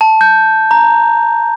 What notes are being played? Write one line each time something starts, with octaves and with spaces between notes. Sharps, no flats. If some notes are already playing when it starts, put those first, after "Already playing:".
A5
G6
A#5